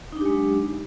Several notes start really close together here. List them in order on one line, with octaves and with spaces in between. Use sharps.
D#4 D4 G4 G#3 F#3